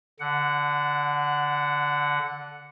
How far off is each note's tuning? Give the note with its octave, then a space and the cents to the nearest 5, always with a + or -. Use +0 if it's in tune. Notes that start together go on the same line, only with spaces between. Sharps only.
D3 -10 F#5 +0